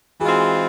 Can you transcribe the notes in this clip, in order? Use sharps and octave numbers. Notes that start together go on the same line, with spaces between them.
E3 G#3 C4 F4 F#4 G#4